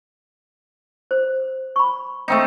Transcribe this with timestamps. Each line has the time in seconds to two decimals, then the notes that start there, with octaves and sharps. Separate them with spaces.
1.11 C5
1.76 B5 C#6
2.28 A3 C4 D#4